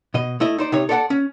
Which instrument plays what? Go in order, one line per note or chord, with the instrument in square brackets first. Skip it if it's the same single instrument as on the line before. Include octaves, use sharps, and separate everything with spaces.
[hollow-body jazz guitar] B2 D#5
A3 E4 D#5
D#4 C5 D5
C3 D#4 C#5
A4 C#5 D5 E5 F#5 A5
C#4